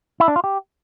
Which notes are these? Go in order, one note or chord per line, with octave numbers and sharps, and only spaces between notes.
E4
D4
F4
G4